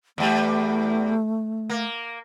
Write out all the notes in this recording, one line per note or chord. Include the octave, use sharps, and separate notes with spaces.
E2 G3 A3
A#3